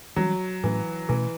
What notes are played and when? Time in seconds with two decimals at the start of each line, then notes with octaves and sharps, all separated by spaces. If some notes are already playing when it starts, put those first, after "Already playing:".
0.16 E3 F#3 G3 C#4
0.64 A2 E3 F#3 A3 C#4
1.09 B2 E3 A3 C#4